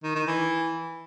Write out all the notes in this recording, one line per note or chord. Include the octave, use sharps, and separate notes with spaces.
D#3
D#3
E3